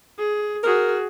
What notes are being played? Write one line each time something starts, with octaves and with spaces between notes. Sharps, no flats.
G#4
F#4 G#4 A#4